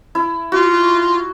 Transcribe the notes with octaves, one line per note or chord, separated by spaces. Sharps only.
E4
F4 F#4